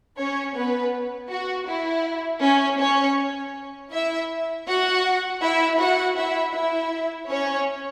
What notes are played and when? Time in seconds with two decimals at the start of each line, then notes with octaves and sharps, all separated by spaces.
0.18 C#4 C#5
0.56 B3 B4
1.31 F#4
1.68 E4
2.43 C#4
2.81 C#4 C#5
3.93 E4 E5
4.68 F#4 F#5
5.43 E4 E5
5.80 F#4 F#5
6.18 E4 E5
6.55 E4 E5
7.30 C#4 C#5